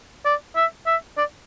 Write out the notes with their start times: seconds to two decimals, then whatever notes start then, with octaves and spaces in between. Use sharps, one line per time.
0.25 D5
0.56 E5
0.87 E5
1.18 D5